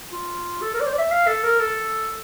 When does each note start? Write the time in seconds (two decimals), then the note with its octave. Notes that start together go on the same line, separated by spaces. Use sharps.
0.12 F4
0.62 A4
0.74 A#4
0.80 D5
0.86 C5
0.93 D5
0.98 E5
1.11 F5
1.27 A4
1.43 A#4
1.60 A4